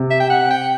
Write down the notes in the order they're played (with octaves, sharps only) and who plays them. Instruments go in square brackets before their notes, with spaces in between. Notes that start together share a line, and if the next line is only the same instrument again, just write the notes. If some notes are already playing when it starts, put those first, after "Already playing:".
Already playing: [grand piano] C3
[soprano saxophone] E5
G5
F#5
G5